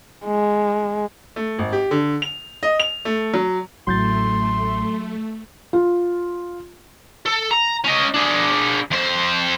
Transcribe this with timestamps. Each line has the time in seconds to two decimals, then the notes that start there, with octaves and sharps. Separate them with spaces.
0.25 G#3
1.36 A3
1.59 G#1
1.73 G4
1.91 D3
2.22 F7
2.63 D#5
2.80 F7
3.05 A3
3.34 F#3
3.87 A1 F#3 A3 C6 G6 A6
5.73 F4
7.26 A4
7.51 A#5
7.84 C#4 D#5
8.14 D4 G#4
8.91 F2 C5